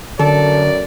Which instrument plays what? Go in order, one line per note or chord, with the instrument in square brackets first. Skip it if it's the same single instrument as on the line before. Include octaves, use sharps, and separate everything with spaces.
[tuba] F#2 [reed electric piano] D3 [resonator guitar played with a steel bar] A4 [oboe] D5